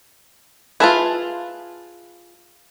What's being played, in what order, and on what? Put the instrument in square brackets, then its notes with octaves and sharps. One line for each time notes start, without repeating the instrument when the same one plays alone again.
[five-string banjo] F4 G#4 [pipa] B4 E5 A5